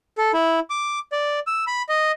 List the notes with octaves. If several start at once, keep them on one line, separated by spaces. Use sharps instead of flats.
A4
E4
D6
D5
E6
B5
D#5